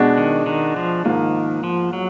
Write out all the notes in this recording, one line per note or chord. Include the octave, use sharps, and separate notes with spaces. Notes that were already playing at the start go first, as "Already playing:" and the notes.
Already playing: B2 G#3 D4 F#4
D#3
D#3
F3
G#2 D#3 F3 A#3 F4
F3
F#3